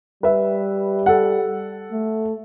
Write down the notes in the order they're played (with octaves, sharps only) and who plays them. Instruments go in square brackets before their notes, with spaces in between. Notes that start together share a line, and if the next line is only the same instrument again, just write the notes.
[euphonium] G3 [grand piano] B4 E5
[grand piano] A4 F#5
[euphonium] A3